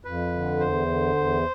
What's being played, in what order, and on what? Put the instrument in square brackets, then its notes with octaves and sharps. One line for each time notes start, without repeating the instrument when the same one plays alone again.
[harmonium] F2 [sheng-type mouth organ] B4
[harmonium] D3
[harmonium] E2 [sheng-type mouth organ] C5
[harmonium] D3
E2